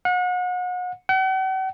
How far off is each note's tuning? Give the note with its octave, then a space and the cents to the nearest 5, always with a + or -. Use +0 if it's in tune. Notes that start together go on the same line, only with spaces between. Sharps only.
F#5 -35
F#5 +45